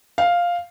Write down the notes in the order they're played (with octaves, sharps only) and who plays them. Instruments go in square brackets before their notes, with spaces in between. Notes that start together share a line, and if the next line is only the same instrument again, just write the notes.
[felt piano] F5